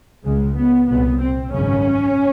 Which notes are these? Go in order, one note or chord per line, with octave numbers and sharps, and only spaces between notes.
C#2 C#3 G#3
B3
C2 A#2 B3
C4
G#1 F#2 C#3 C#4